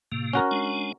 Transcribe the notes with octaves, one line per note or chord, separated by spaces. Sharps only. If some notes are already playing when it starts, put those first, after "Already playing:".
A2 C3 A#3
C#4 F#4 A#4
G#3 D4